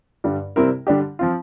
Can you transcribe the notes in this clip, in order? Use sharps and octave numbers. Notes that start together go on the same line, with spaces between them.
G2 D3 G3
C3 G3 C4 E4 A#4
D3 G3 D4 G4
F3 C4 F4